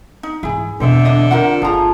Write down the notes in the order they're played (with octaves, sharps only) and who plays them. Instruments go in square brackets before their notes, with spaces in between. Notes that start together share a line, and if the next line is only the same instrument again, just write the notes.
[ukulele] D#4
[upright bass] G#2 E3 [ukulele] E4 G#4
[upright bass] E2 B2 [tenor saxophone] D3 [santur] C4 C5 E5
[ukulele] D4 E4 D#5
[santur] F4 [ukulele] A#4 C5 F#5
[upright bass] G1 [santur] F3 G#4 [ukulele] F5 A#5